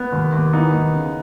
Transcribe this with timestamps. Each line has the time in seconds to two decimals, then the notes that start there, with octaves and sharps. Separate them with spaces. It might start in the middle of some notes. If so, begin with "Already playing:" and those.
Already playing: B3
0.12 D#2
0.33 D#2
0.53 E3 B3 D#4
0.73 D#2
0.94 C#3